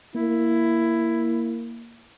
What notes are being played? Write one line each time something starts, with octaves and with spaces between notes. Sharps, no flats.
A#3 E4